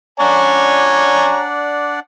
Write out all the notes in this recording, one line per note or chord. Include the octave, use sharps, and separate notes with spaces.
D4 C#5 D5 F#5 G#5 A#5